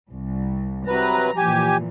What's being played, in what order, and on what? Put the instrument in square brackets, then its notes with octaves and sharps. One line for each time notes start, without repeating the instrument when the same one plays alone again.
[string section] C2
[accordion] C3 F#3 B4 [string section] A#5
[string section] A#2 E3 F3 [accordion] G4 G#5